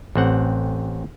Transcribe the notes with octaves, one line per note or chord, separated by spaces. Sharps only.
A1 C4 F#5